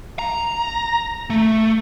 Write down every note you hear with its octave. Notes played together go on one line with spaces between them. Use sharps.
A#5
A3